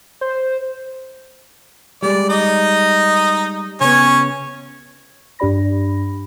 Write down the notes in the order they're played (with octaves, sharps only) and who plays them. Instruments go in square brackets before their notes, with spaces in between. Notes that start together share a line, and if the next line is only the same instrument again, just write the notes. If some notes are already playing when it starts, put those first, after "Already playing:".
[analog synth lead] C5
[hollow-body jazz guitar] G3 G#3 [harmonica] D5
[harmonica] D#4 D#5
[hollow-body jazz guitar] C#3 B3 [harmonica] C#4 C#5
[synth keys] G2 D4 G4 D5 B5 A#6